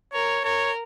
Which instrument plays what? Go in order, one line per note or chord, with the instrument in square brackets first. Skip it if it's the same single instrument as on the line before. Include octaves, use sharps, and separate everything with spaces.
[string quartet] A#4 [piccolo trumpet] C#5
[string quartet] A#4 [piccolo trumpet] C#5